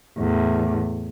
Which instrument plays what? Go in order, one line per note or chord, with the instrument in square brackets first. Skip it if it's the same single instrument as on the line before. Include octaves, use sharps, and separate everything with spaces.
[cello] E2 A2